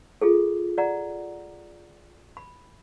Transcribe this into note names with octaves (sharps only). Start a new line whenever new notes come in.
F4 G#4 A4
D5 F#5 A#5
B5